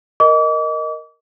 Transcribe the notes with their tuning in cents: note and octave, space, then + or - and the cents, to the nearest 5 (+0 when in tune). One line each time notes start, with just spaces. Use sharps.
A#4 +5 D#5 +0 D6 -40